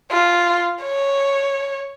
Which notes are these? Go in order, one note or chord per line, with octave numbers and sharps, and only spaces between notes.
F4
C#5